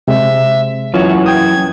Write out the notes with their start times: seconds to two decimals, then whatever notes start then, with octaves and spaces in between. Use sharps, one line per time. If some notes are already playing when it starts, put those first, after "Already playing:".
0.08 C3 G#3 E5
0.94 F#2 E3 F4 F#4 C#5
1.26 G5 D#6 G#6